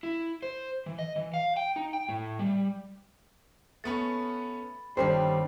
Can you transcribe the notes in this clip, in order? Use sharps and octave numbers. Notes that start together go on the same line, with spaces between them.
E4
C5
E3
D#5
E3
F5
G5
D#4
G5
A2
G3
A3 B3 C#4 B5 A6
G1 D#3 G3 C#4 D4 C5 C7